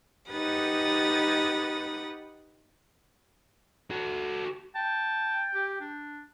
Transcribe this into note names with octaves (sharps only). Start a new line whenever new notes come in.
D#4 G4 B4 F#5 D#6 A6
F#4 A4
G5 A5
G4
D4